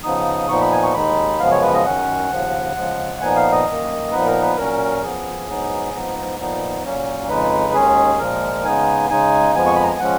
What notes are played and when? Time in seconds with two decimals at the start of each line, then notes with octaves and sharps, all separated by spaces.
0.04 C#3 F3 B3 D#4 D#6
0.49 A#2 F3 B3 D#4 C#6
0.61 B5
0.72 G#5
0.83 C#6
0.94 D#2 D#3 G#3 D#4 B5
1.39 F#2 C#3 F3 G#3 B3 F5
1.51 C#5
1.62 B4
1.74 D#5
1.85 F#2 D#3 F#3 C#4 F#5
2.30 D#2 C#3 F3
2.76 C#3 F3 G#3
3.21 A#2 F3 B3 D#4 G#5
3.36 F5
3.52 D#5
3.67 F#2 D#3 A#3
4.11 A#2 F3 B3 D#4 B4
4.27 A#4
4.42 B4
4.57 A#2 F#3 C#4 A#4
5.02 F#2 F3 B3 G#4
5.47 G#2 F#3 B3 D#4
5.93 G#2 F3 B3 D#4
6.38 A#2 F3 B3 D#4
6.84 A#2 F#3 A#3 C#4
7.28 F2 C#3 G#3 D#4 B4
7.74 D#2 D#3 G#3 C#4 G#4
8.18 A#2 F3 G#3 A#4
8.64 C#3 G#3 B3 D#4 G#5
9.10 C#3 G#3 D#4 G#5
9.55 F2 F3 G#3 B3 G#5
9.67 C#6
9.76 B5
9.83 A#5
9.92 G#5
9.99 F3 G#3 C#4 F#5